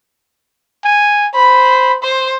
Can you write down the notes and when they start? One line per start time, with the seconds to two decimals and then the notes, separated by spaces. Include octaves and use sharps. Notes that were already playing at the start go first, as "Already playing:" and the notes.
0.84 G#5
1.34 C5 B5
2.03 C5